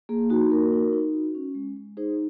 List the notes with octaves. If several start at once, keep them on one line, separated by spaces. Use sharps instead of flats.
A#3 G#4
D#4 F#4
A#3 F#4 A#4
D#4
D#4
F#4
C#4
G#3
G#3
D#4 G#4 C5